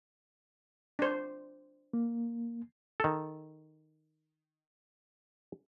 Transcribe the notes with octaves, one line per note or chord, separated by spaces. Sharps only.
D4 C5
A#3
D#3 A4